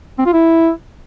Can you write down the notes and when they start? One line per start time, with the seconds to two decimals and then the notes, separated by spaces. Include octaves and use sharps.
0.18 C4
0.26 F4
0.33 E4